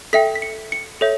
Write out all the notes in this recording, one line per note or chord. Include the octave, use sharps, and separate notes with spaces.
A4 E5 G5 B6
B6
C#7
C#7
A4 C#5 E5